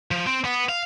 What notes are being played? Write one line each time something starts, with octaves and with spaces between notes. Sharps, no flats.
F3
C4
B3
F5